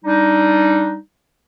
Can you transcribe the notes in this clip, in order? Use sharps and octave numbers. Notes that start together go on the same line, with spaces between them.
G3 D4 D#4